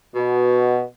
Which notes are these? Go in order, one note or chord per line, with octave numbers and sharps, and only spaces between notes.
B2